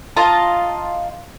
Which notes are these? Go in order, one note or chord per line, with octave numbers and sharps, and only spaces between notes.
F4 D#5 A5 A#5